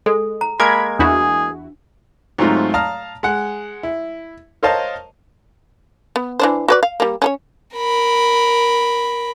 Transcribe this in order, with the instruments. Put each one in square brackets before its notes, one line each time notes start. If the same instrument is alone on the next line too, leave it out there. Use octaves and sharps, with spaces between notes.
[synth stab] G#3 [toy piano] A4
[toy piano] A#5
[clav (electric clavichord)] G#3 A#3 A#4 [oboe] B5 [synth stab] G#6
[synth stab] E2 E4 F#4 [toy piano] D4 B4 [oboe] G#4
[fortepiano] G#2 F#3 A3 C4 D#4 F4
F5 A5 A#5 D#6 F6
G#3 F#5
E4
A#4 C5 C#5 D#5 F5 A5
[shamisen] B3
E3 D4 C5
F#4 B4 D5
F5
G3 A#3
C#4 A4 C#5
[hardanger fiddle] A#4 B5